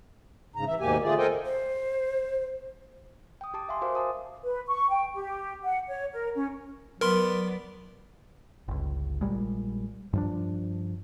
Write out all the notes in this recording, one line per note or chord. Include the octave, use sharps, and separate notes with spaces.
G#2 C#3 A#5
E3 E5
D#2 G#2 B2 A#3 G4 G#5
D3 A3 F4 G#4 D5
A4 A#4 C5 D#5 G5 G#5
C5
G5 D#6
G4 A5 D6
E5 F5 G#5 C6
F#4 A#4 C5 F5 D6
G#5 A5 D#6
B4
C#6
G5
G4
F#5
C#5
A#4
C#4
F#3 B3 A#4 D5 C6
G1 C#2
A#1 A#2 G3 G#3
G2 F3 D4